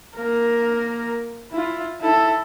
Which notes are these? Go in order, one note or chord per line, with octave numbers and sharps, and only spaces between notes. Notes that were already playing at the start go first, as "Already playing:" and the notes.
A#3 A#4
E4 F4
E4 A4